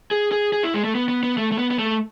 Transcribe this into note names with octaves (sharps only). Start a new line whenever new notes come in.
G#4
G#4
G#4
E4
G#3
A3
B3
B3
B3
A3
A3
B3
B3
A3